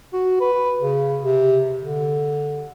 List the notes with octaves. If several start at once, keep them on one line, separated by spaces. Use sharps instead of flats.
F#4
B4
C#3
C3
D3